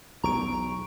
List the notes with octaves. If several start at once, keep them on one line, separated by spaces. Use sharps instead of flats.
B1 E2 A#5 C#6 D7